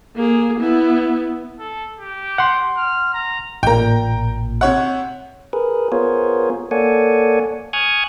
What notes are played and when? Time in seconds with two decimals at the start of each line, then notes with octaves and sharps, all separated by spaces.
0.16 A#3 G#4
0.60 B3 E4
1.59 A4
1.99 G4
2.38 F#5 C6
2.77 F6
3.14 A#5
3.63 A1 A#2 G5 A#5
4.61 C3 C#5 F#5
5.53 G#4 A#4 B4
5.92 B3 F4 G#4 A#4 C5 C#5
6.71 A#3 A4 C#5 D5 F#5 G#5
7.73 G#5 C#6 D#6 F6 F#6 G#6